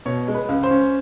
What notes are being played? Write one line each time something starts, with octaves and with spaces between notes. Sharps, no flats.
B2 C#5
G#3
B4
C#2
C5
C#4